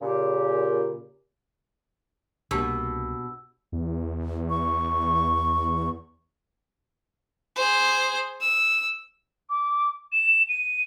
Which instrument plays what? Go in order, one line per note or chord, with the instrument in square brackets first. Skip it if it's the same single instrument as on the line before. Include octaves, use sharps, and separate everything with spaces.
[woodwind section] A#2 C#3 G4
[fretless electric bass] C2 A#3 [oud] B2 [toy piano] D4 G4 A5 [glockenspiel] E6
[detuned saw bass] E2
[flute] C#6
[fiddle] G#4 C5
E6
[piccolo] D6
E7
D#7